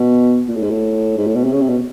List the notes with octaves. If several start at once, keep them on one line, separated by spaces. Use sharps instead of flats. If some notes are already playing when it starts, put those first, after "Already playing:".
Already playing: B2
A#2
A2
G#2
A2
G#2
A2
B2
C3
C#3
C3
B2